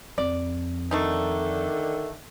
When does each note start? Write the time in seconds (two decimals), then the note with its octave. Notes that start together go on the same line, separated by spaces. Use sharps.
0.18 F2 D5
0.91 D3 D#3 A3 D4 D#4